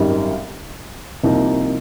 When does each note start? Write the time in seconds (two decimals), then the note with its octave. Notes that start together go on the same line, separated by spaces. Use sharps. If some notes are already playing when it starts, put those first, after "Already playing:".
Already playing: G#1 F#2 D#3 G3
1.23 C2 C3 F3 A#3 D#4